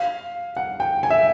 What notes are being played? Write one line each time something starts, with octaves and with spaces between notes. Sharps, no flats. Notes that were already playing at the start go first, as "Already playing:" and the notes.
Already playing: F5
F#5
G5
G#5
E5